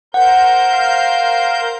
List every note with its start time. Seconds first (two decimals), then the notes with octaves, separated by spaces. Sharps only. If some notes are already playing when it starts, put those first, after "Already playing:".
0.14 A#4 C5 F#5 G6
0.72 F5